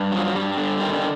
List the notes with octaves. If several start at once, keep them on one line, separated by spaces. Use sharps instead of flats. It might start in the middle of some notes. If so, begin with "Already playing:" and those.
Already playing: G2
F3 F#3
G2 G3
D3
D#3 G3
G3